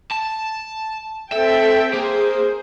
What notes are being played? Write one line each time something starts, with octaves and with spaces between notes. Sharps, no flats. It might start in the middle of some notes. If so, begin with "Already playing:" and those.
A5
C4 A4 E5 G5
A#3 G#4 C5